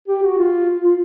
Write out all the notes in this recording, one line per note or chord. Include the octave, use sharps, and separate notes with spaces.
G4
F#4
F4
F4